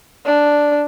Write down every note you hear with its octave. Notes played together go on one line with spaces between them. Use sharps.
D4